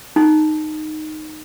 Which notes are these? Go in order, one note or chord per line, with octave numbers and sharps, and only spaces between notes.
D#4